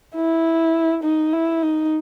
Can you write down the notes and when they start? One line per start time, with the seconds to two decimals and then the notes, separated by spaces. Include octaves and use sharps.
0.15 E4
1.03 D#4
1.33 E4
1.62 D#4